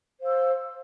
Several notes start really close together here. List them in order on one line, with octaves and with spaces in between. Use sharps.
C5 F5 E6